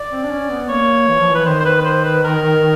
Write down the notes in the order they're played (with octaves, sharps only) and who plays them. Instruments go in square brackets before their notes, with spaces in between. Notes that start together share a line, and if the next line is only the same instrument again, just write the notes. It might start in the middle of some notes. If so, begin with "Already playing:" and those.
Already playing: [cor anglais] D5
[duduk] C4
D4
C#4
B3
[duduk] A#3 [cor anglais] C#5
[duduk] E3
F3
E3
[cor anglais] B4
[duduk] D#3 [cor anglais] C5
[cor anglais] C5
B4
B4
C5
B4
A#4